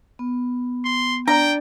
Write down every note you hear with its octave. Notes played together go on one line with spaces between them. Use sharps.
B3
C6
D4 D5 G5 A#5